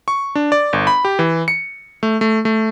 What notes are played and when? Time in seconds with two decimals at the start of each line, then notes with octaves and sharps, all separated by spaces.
0.08 C#6
0.35 D4
0.52 D5
0.73 G1
0.87 B5
1.05 G4
1.19 E3
1.48 C#7
2.03 A3
2.21 A3
2.45 A3